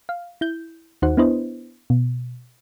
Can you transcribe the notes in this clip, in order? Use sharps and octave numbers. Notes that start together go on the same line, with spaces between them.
F5
E4 G6
D#2 D#4 F#4 C5 F#5
B3 D4 E4 B4 C5 D#5
B2